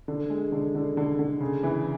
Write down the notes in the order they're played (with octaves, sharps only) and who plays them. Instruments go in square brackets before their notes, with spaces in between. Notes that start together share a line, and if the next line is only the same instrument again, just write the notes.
[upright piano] D3
G#3
D3
D3
D3
D3
C#3
E3